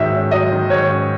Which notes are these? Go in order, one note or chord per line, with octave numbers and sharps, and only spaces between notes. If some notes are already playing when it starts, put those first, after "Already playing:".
Already playing: G#2 D#3 F#3 E5
C#4
F#3 D#5
D#3
G#2 C#5
C#4